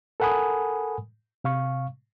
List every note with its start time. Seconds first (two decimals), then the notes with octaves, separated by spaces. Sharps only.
0.20 A4 A#4 F#5 G#5 B5 D#6
1.44 C3 F5 C#6